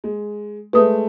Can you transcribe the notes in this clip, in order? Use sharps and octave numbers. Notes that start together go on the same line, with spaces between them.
G#3
G#3 A3 B4 D#6